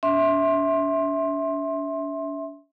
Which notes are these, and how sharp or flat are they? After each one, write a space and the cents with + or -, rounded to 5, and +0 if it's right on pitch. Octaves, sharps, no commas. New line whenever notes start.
D4 -45 E5 -10 C6 +20